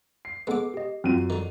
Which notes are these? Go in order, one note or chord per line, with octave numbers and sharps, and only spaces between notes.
C7
G#3 B3 A4 B4 D6
G4 D#5
F#2 C4 F4 D#7
D3 D#3